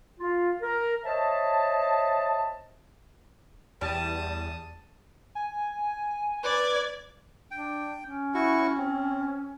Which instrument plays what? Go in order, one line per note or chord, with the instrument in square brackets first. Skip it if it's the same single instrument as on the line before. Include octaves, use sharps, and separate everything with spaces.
[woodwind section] F4
A#4
C5 C#5 D#5 E5 A5
[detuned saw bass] E2 [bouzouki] G3 [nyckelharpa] A5 D#6
[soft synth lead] G#5
[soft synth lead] B4 [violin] D5 G#6
[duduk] D4 [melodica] G5
[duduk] C#4
[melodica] E4 F#4 C#6
C4